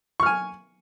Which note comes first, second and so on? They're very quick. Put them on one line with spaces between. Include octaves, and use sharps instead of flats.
C#6 F6 G#5